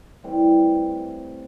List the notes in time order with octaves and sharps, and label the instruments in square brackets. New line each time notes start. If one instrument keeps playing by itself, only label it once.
[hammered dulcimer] A2 E3 G3 C4